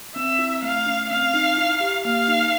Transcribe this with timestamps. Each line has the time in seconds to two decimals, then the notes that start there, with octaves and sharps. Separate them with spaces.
0.16 C4 E5
0.39 E4
0.62 A3 F5
0.86 C#4
1.10 C4 F5
1.34 D#4
1.57 E4
1.80 G4
2.04 A#3 F5
2.28 D#4